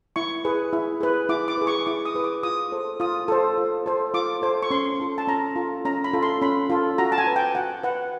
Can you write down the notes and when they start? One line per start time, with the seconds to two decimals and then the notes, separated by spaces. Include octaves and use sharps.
0.16 E4 C#6
0.45 G#4 B4
0.73 E4
1.01 G#4 B4
1.29 E4 D6
1.48 D6
1.57 G#4 B4
1.67 C#6
1.86 E4 D6
2.05 D#6
2.15 G#4 B4
2.24 D6
2.43 F4 D#6
2.72 A4 C5
3.00 F4 D#6
3.28 A4 C5
3.57 F4
3.86 A4 C5
4.14 F4 D6
4.42 A4 C5
4.62 C#6
4.71 C#4 C6
5.00 F4 A4
5.18 A5
5.27 C#4 A#5
5.56 F4 A4
5.85 C#4 A#5
6.04 B5
6.13 F4 A4
6.23 C6
6.41 C#4 B5
6.70 F4 A4
6.98 F#4 A#5
7.12 A5
7.18 G#5
7.27 B4
7.36 G5
7.55 F#4 F#5
7.83 B4 F#5